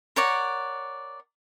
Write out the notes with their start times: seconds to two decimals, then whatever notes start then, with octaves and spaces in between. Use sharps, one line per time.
0.16 A#4 C#5 D5 F#5